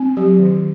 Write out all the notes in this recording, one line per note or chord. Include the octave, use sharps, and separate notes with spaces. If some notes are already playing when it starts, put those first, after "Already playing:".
Already playing: C4
F#3 G4
D#3